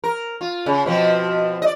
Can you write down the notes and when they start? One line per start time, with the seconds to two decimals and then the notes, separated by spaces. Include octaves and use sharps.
0.04 A#4
0.41 F4
0.66 C#3
0.86 B2 F3 C4
1.62 D5 D#5